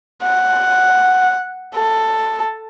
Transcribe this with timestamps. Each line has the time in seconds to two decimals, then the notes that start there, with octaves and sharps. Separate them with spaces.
0.23 F#5
1.75 A4